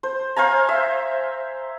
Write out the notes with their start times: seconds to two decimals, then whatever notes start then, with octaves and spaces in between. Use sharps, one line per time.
0.03 C5
0.36 C5 F5 G#5 A#5
0.69 E5